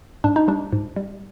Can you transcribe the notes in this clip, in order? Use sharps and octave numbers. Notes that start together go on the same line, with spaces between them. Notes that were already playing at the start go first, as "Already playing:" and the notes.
G#2 D4
D#4
G3 D4
G#2
G3